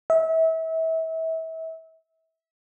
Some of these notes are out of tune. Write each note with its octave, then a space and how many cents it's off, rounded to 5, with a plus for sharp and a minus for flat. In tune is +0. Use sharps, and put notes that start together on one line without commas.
E5 -30